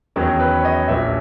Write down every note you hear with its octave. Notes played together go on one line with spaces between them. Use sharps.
E2 D#3 F#3 C#4 G#4
B4
C#5
D#5
A#1 A#2 F#3 E5